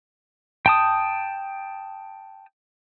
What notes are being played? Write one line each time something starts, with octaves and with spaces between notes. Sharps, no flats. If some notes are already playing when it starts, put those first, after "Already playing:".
G5 A5 D#6